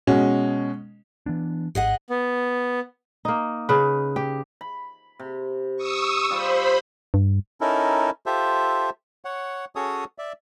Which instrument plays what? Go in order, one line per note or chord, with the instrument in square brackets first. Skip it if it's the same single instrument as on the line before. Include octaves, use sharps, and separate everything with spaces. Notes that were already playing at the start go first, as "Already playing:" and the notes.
[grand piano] B2 G#3 C#4 F#4
[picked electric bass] E3 B3 D4
[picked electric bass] G#1 [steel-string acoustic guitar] G#4 D#5 F#5
[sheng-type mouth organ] B3
[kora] A#3 D#4
C#3 B4
G4
[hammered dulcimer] B5
C3
[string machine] C#6 D#6 E6
[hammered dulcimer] G3 F4 [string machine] C5 B5
[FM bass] G2
[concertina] C#4 D#4 E4 A4 A#4
F4 G4 A4 C5 E5
C#5 F#5
C#4 F#4 G#4 A4 C#5 D#6
D5 E5